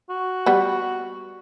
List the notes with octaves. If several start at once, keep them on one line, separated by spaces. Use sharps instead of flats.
F#4
G3 B3